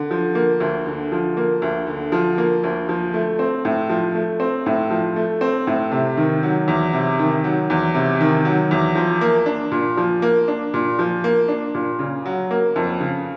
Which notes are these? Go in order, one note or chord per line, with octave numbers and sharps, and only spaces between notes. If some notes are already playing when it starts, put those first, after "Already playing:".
Already playing: D3
F3
A#3
D2
D3
F3
A#3
D2
D3
F3
A#3
D2
F3
A3
C4
A2
F3
A3
C4
A2
F3
A3
C4
A2
C3
D#3
F#3
E2
C3
D#3
F#3
E2
C3
D#3
F#3
E2
F3
A#3
D4
A#2
F3
A#3
D4
A#2
F3
A#3
D4
A#2
C#3
F#3
A#3
F2
C#3